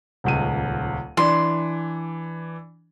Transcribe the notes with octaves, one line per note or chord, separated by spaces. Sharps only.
D#1 C#2 D#7
E3 D4 C6